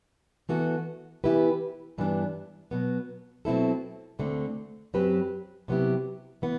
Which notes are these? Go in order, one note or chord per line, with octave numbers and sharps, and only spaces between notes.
E3 B3 F#4 A4
E3 B3 E4 G4 B4
G2 E3 G3 B3 D4
B2 F#3 B3
B2 F#3 C4 E4 A4
D2 D3 A3 C4
F#2 F#3 C4 G4 B4
C3 F#3 B3 E4 G4
E3 B3